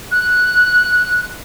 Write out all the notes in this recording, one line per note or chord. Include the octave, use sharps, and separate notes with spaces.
F#6